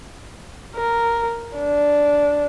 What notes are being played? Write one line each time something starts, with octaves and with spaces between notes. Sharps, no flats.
A#4
D4